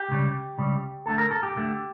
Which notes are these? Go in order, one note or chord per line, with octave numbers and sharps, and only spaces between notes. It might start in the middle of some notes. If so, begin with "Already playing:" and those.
Already playing: G4
C#2 C#3 G3
C#2 C#3 G3
D2 D3 A3 A4
A#4
A4
G4
D2 D3 A3